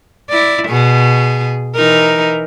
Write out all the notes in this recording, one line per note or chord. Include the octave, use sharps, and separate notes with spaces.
E4 D5
B2 G#4
E3 D#4 A#4